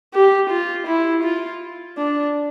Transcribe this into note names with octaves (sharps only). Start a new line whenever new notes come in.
G4
F4
E4
F4
D4